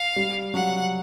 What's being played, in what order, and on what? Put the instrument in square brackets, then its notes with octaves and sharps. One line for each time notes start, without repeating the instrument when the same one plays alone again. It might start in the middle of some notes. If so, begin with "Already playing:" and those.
Already playing: [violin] F5
[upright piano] G3
[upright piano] F#3 [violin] F#5